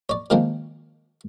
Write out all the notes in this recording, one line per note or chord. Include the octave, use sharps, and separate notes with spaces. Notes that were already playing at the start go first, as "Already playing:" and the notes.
C#5 D5
D#3 F3 G#3 A#3 C4